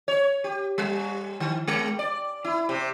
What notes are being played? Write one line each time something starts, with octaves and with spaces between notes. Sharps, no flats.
C#5
G4
G3
D#3
G#3
D5
E4
C3